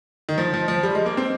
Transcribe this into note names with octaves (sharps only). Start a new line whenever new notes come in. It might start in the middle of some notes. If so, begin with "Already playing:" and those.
D#3
F3
F3
F3
G3
G#3
A#3
C4